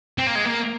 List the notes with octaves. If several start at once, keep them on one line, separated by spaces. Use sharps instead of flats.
C4
A#3
G#3
A#3